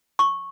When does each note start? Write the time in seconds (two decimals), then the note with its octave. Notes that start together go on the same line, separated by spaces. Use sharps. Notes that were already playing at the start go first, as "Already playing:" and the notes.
0.19 C#6